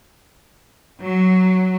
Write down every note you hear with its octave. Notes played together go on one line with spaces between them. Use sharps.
F#3